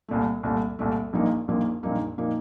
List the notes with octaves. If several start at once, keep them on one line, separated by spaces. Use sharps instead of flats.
C2 A#2 A3
C2 A#2 A3
C2 A#2 A3
A#1 A#2 F3 A#3 D#4
A#1 A#2 F3 A#3 D#4
A#1 A#2 F3 A#3 D#4
A#2 F3 A#3 D#4